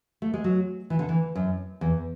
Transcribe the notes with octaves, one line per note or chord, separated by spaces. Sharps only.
A3
G#3
F#3
E3
D3
E3
F#2
E2